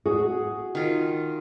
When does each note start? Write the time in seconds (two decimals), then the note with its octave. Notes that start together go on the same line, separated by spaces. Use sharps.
0.06 F#4 G#4
0.75 D#3 F4